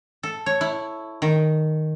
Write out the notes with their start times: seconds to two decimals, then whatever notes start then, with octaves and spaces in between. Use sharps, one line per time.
0.23 A4
0.46 C#5
0.61 E4
1.22 D#3